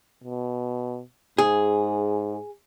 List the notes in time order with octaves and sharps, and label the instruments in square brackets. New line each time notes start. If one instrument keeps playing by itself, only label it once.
[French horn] B2
[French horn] G#2 [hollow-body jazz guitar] G#4